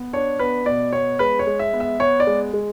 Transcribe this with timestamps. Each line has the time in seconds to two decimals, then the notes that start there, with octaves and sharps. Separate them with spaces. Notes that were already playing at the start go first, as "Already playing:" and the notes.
Already playing: B3
0.13 D4 C#5
0.39 B3 B4
0.66 B2 D5
0.93 B3 C#5
1.19 G#3 B4
1.39 C#5
1.47 G#3
1.59 E5
1.73 B3
1.80 E5
1.99 B3 C#5
2.20 D5
2.27 G#3
2.53 G#3